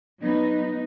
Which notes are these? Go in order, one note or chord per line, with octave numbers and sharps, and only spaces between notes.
F#3 B3 D#4